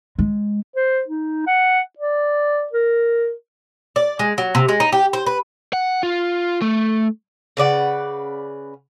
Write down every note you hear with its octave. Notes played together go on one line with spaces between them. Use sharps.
G#3
C5
D#4
F#5
D5
A#4
D5
G#3
F#3
C3
G#3
D#4
G4
C5
B4
F#5
F4
A3
C#3 B4 D5 F#5